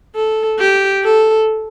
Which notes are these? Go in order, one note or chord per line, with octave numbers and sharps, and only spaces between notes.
A4
G4
A4